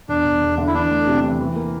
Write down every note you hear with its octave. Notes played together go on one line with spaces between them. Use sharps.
E2 D4
E2
E2
D3
E4
E3 D4
A3
C3
E3
E3
A#3